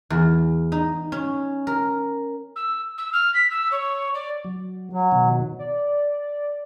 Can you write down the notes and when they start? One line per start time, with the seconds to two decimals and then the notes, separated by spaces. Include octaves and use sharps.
0.10 E2
0.72 D#4
1.12 C#4
1.67 A#4
2.56 E6
2.98 E6
3.13 F6
3.34 B6
3.50 E6
3.72 C#5
4.14 D5
4.44 F#3
4.93 F#3
5.12 B2 D#3
5.59 D5